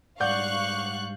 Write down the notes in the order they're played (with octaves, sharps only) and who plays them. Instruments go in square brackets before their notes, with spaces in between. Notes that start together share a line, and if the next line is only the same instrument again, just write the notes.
[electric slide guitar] G#2 G3 [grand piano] D5 F#5 G6 [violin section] F5 C#6 F#6